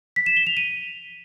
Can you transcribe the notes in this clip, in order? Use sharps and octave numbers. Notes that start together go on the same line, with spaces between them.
B6
E7
G7
F7
D#7